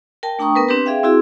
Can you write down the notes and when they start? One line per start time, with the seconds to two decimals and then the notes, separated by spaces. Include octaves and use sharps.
0.23 A#4 G5 A5
0.39 A3 D4 G5 A#5 C#6 D#6
0.55 B3 A#4 B4
0.69 C4 D4 G4 B4
0.86 G#4 E5 F5 G5
1.03 C4 E4 F#4 G#4